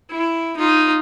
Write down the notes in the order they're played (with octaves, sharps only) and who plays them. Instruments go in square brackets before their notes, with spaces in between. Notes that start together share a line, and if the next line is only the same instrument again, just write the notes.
[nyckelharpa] E4
D#4 F4